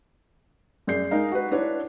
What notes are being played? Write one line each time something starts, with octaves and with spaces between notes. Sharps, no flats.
F#2 G#4 D5 G6 C7
G#3 D#4 A#4 F5
F#4 B4
D4 E4 B4 C#5